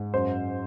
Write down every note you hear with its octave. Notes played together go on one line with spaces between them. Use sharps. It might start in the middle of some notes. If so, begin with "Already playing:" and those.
Already playing: G#2
F#2 C5